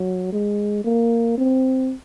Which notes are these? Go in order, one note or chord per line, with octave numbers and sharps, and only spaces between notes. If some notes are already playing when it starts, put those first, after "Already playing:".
Already playing: F#3
G#3
A#3
C4